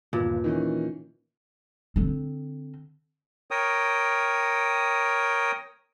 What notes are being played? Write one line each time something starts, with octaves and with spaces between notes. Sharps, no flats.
G1 D#2 A#2
D#3 E3 C#4
D3 C4
A#4 C#5 G5 D#6